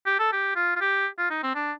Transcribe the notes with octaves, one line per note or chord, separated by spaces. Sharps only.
G4
A4
G4
F4
F4
G4
F4
D#4
C4
D4